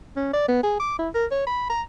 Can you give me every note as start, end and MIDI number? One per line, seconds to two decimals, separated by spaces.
0.16 0.29 61
0.33 0.48 74
0.48 0.63 59
0.63 0.77 68
0.80 0.98 86
0.99 1.09 64
1.15 1.26 70
1.31 1.46 73
1.47 1.67 83
1.70 1.82 82